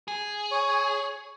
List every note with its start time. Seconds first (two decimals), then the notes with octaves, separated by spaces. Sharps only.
0.08 G#4
0.51 C#5